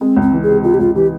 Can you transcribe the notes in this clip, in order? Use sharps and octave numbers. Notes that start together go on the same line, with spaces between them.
G#3 C4
C#2
C4
E3
C3 G#4
G#3 F4
G4
C#2 F4
E3 G4